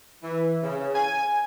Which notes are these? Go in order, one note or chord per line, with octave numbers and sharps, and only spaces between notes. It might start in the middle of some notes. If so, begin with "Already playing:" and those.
E3
C#3
G#5